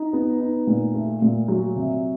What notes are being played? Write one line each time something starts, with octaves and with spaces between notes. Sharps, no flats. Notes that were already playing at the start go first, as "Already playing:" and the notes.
Already playing: D#4
B3
D#4
A#2
A3
A#2
F#3
C3